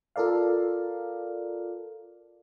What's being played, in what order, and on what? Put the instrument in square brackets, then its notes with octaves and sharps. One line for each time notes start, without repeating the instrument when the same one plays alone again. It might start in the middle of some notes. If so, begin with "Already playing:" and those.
[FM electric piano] F4 A4 A#4 D5 F5